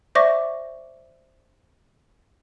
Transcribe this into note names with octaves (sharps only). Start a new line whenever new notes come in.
C5 D5 E5 C#6 D6 A#6